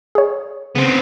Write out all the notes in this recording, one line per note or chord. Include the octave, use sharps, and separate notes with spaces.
G#4 C#5
C#3 B3 C4